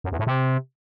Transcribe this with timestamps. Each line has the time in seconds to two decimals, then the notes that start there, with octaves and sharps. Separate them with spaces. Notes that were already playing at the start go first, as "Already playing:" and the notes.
0.04 F#2
0.12 E2
0.19 A2
0.27 C3